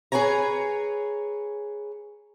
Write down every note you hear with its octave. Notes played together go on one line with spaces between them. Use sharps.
G#4 B4 C#5 G#5 A#5